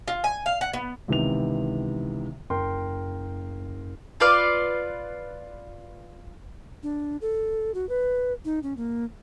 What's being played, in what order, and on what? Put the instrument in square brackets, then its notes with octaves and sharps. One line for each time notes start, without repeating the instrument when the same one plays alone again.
[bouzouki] F4
G#5
F5
F#5
B3
[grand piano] C#2 C3 D#3 E3 B3 F7
F#1 A#4 G5 C6
[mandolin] F4 B4 D5 F5
[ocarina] D4
A4
F#4
B4
D#4
C#4
A#3